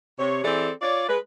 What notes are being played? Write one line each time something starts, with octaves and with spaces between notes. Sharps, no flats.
C3 C#5
E3 C4 G#4 A4 D5
F4 C#5 D5
G#3 B4